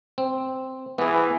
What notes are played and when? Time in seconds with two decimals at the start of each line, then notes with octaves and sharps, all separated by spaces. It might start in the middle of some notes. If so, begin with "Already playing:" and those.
0.18 C4
0.98 E3 B3 G#4